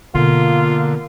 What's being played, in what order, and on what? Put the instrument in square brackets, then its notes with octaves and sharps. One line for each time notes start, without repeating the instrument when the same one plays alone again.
[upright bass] B2 [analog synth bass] D3 [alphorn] A#3 [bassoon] F4